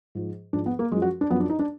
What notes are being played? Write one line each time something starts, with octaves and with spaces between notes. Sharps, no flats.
G#2 F3
G#2 F3 D4
B3
A#3
F#2 F3 G#3
F#4
D4
F#2 F3 B3
D4
D#4
D4